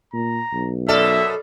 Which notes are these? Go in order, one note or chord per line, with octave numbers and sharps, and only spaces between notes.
A#2 A#5
B1
F#2 B2 A4 D5 E5 F6